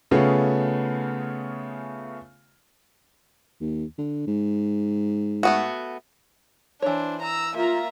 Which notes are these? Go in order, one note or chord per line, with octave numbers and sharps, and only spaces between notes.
C#3 A3 B3 C#4 F4 G#4
D#2
D3
G#2
A3 B3 F#4
E3 D4 C5 C#5
A#5 E6
A#3 F4 E5 A#5